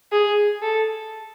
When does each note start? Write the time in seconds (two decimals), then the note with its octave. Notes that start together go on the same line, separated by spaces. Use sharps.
0.12 G#4
0.62 A4